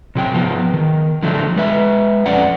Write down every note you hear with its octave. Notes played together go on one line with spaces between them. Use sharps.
C3 F#3 G5
F3 B3
D#3
D3 F3 F#3 A3
G#3 B4 E5
F2 C#4 D5 F#5